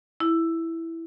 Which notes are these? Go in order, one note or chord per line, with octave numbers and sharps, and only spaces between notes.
E4